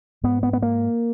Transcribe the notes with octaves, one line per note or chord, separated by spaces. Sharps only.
G#2 B3
B3
B3
A#3